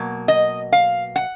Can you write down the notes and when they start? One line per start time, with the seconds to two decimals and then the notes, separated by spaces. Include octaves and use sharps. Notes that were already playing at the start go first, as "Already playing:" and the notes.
Already playing: B2 F#3 A#3
0.28 D#5
0.72 F5
1.16 F#5